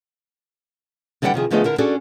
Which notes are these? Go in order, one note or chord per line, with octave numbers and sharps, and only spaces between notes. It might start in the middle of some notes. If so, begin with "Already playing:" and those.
D3 E3 G3 D#5 F#5 G5
C3 D#3 F3 G#4
D3 F3 A3 B3 G#4 D#5
D3 E4 A#4
C#4 D4 F#4 G#4 A4 D5